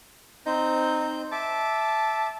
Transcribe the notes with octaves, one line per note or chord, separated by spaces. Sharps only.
C4 D#4 C5 G6
E5 A5 D6